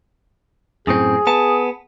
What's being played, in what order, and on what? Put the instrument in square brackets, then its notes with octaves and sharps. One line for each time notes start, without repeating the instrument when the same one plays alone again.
[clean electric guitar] F#2 A2 C4 [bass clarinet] G#4
[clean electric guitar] B3 A5